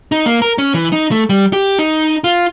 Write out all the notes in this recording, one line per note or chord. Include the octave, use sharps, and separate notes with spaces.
D#4
A#3
A#4
C#4
E3
D#4
A3
G3
G4
D#4
F4